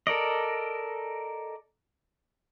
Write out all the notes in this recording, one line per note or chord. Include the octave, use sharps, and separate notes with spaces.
A4 A#4 D5 D#5